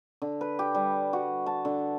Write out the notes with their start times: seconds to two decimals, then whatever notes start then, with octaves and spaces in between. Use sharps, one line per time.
0.22 D3
0.41 B4
0.59 G4
0.75 G3
1.13 F#4
1.46 A5
1.65 D3